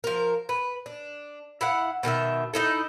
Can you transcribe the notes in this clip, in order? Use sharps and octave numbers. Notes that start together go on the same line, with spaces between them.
F3 A#4
B4
D4
E4 F5 F#5
B2 D#3 G#4 E5
D#4 E4 A4